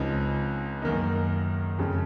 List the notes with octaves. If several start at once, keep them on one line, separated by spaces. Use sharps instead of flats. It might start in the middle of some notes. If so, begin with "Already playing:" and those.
Already playing: C#2 C#3 F3 C4 D#4
F#2 D#3 A#3 D#4
F2 C#3 G#3